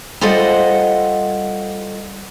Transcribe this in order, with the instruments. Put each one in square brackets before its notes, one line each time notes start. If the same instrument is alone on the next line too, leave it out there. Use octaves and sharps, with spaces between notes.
[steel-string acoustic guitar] G3 F4 A4 C5 D#5 F#5